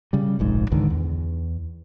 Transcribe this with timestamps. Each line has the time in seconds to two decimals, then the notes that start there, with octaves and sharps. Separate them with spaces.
0.13 C#3 G3
0.39 F1 A#1 G#2
0.72 C#2 G#2 D3 D#3
0.90 E2